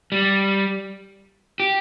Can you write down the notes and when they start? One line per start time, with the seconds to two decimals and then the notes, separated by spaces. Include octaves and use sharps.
0.12 G3
1.60 G4